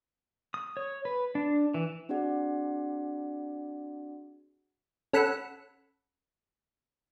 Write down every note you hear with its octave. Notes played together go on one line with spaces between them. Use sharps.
D#6
C#5
B4
D4
E3
C4 D4 F#4 G#4 D5 F#5
C#4 A4 F#5 B5 E6 C#7